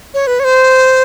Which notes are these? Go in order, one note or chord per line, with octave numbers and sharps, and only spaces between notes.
C#5
B4
C#5
C5